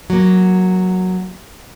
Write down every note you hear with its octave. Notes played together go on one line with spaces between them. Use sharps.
F#3 A#3